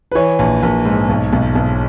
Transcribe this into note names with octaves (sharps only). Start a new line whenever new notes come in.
B4
E3 C#5
A#1
A#1
G#2
B1
B1
B1